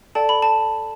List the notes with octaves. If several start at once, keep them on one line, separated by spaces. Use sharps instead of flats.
A4 D5 G5 A5
B5
A5